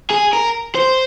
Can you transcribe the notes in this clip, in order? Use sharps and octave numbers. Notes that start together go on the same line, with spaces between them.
G#4
A#4
C5